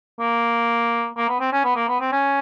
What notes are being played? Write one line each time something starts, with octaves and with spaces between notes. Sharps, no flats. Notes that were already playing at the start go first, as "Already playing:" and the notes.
A#3
A#3
B3
C4
C#4
B3
A#3
B3
C4
C#4